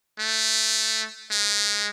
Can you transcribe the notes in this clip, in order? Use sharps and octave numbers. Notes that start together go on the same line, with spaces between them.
A3
G#3